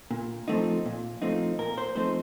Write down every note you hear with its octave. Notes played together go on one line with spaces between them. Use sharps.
A#2
F3 A3 C4 D#4
A#2
F3 A3 C4 D#4
A#2 A#4
C5
F3 A3 C4 D#4 C5